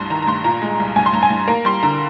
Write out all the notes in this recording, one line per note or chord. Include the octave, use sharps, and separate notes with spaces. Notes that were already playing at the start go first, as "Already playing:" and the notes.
Already playing: C2 G2 C6
D#3 A#5
A#5
G2 C6
A#2 A#5
G#3
C2
G2 G#5
C6
G2 A#5
G#5
G2
A#3 A#5
G3 C6
D3 A#5